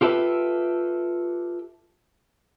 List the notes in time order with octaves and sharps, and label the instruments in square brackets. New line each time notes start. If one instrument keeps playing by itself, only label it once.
[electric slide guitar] F4 G4 A4 B4 E5